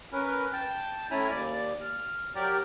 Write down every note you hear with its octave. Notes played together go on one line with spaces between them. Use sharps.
C#4 A#4 B4
G5 A5
A2 C#4 E4 G#5 A#5 B5
D#2 D5
F6
F#3 G4 A#4 D5